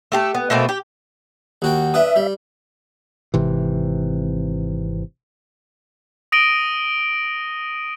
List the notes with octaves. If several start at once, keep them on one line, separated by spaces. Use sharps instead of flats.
A3 G4 A4
B3
B2 A3 A#3 C4
G4
D#2 F#4 G5
D4 B4 E5 D#6
G3
G#1 C3 E3
D#6 A#6 D7 D#7 F#7 G7